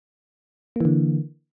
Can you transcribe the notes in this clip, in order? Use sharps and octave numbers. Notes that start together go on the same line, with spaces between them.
D3 E3 A#3